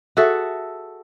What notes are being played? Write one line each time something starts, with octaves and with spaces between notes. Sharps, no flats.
F#4 G#4 A4 E5